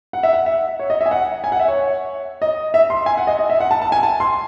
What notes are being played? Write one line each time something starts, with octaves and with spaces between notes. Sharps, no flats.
F#5
E5
F#5
E5
C#5
D#5
E5
G#5
F#5
G#5
F#5
E5
C#5
D#5
E5
C6
G#5
F#5
D#5
D#5
E5
F#5
A5
A5
G#5
A5
C6